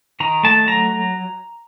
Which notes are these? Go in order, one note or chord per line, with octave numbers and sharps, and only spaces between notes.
D#3 A#5
A3 A5
F#3 A#5